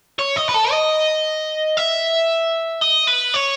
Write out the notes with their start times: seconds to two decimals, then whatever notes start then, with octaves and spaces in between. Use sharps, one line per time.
0.19 C#5
0.36 D#5
0.49 B4
0.54 A4
0.71 D#5
1.77 E5
2.82 D#5
3.08 B4
3.34 C#5